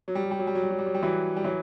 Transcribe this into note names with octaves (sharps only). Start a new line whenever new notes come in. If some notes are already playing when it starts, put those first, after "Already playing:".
F#3
G3
F#3
G3
F#3
G3
F#3
G3
F#3
G3
F#3
G3
E3 F#3
G3
E3 F#3